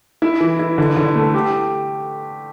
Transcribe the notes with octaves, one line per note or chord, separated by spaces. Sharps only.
E4
E3
E4
D3
D3
A3
G4